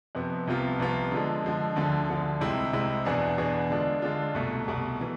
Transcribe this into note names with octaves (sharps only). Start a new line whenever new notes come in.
F2 C3 F3 B3
C2 C3 F3 B3 F4
C2 C3 F3 B3 F4
D3 F3 G#3
D3 F3 G#3
D2 D3 F3
D2 D3 F3
C2 C3 G#3 C4 E4
C2 C3 G#3 C4 E4
E2 B2 B3 D4 G#4
E2 B2 B3 D4 G#4
D3 G#3 D4 F4
D3 G#3 D4 F4
C2 B2 A3
C2 B2 A3
E3